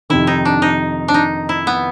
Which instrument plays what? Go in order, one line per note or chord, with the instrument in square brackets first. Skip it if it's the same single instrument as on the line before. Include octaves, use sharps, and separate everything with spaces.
[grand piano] F2 C3 D#3 [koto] E4
[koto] D#4
D4
D#4
D4
D#4
E4
B3